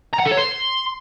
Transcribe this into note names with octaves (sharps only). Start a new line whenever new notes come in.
A#5
F#5
A4
C#5
C6